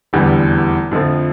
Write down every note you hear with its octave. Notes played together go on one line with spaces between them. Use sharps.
F1 E2 D3 G3 B3
F2 D3 F3 A3 C4